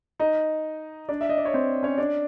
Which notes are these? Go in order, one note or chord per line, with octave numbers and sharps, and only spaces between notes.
D#4 D#5
D4 D5
E5
D#5
D5
C#5
C4 C5
C#4 C#5
D4 D5